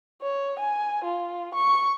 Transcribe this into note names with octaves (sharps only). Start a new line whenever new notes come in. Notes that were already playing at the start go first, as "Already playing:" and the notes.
C#5
G#5
F4
C#6